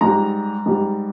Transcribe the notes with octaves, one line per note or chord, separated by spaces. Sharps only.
G#2 G3 A#5
G#2 G3